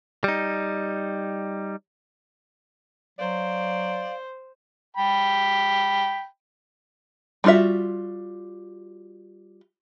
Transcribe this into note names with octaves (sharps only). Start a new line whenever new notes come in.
G3 D#4
F#3 C5 D5 F5
G5 B5
G3 D#4 F4 F#4 E5